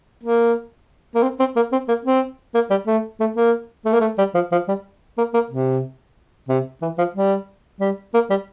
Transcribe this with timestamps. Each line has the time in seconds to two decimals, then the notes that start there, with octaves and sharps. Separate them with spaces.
0.24 A#3
1.15 A#3
1.23 C4
1.40 C4
1.56 A#3
1.72 C4
1.88 A#3
2.05 C4
2.54 A#3
2.70 G3
2.87 A3
3.20 A3
3.36 A#3
3.86 A3
3.93 A#3
4.01 A3
4.18 G3
4.35 F3
4.52 F3
4.68 G3
5.18 A#3
5.34 A#3
5.50 C3
6.49 C3
6.82 E3
6.98 F3
7.15 G3
7.80 G3
8.14 A#3
8.30 G3